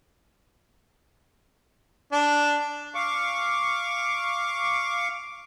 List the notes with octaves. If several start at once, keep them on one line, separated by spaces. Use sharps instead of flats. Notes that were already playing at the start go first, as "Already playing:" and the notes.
D4
F5 C#6 D6